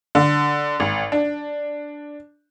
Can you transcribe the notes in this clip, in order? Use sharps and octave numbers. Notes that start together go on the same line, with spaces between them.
D3
G#1
D4